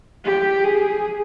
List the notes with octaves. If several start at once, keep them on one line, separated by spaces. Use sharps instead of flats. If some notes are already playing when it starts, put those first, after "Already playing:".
G4
G#4